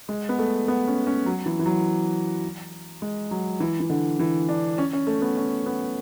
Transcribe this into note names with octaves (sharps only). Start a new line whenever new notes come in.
G#3
B3
A3
B3
C#4
C#4
F#3
E3
E3
F#3
G#3
F#3
E3
E3
D3
E3
D4
C#4
C#4
A3
B3
C#4
B3